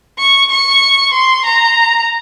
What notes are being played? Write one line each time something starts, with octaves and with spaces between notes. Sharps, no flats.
C#6
C#6
C6
A#5